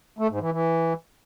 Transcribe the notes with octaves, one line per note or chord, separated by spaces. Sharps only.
A3
G#2
E3
E3